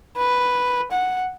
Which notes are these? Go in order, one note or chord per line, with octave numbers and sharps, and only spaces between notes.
B4
F#5